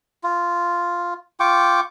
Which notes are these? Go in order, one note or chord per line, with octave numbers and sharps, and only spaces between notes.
F4
F4 G5 C#6 D6